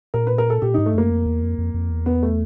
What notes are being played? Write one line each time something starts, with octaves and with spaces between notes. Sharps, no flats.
A#2 A#4
B4
A#4
A4
A#2 G4
G#2 D#4
A3
F#2 A#3
F2
E2
F2
F2
F2
E2
B3
A3